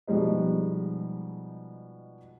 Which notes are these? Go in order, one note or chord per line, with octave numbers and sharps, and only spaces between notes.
B2 F3 G3 G#3 D#4